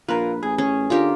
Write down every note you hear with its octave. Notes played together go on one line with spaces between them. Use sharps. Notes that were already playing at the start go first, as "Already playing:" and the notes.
A#1 F4 A#4 B4
A1 G#4
C#4 G#4
D3 F4 G4 A#4